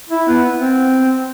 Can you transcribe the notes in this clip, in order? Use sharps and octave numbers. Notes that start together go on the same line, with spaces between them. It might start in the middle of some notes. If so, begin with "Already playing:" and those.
E4
B3
C4